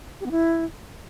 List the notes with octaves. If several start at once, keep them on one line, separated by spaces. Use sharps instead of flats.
G4
B3
E4